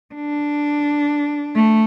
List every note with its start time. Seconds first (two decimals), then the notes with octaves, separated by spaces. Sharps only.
0.15 D4
1.56 A3